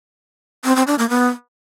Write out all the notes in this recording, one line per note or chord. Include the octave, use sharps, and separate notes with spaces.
C4
C4
D4
A#3
B3